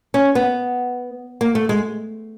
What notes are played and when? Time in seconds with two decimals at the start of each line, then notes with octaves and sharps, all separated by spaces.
0.14 C#4
0.35 B3
1.41 A#3
1.55 A3
1.69 G#3